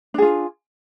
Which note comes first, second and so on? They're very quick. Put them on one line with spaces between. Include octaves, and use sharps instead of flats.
D4 G#4 F4